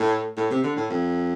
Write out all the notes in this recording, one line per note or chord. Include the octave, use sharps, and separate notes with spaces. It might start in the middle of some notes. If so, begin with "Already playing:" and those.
Already playing: A2
A2
C3
D3
A2
F2